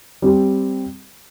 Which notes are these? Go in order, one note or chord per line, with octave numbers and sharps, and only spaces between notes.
G3 C4 G4